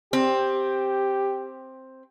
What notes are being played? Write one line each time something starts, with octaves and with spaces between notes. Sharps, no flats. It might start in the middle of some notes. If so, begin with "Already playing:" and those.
C4 G4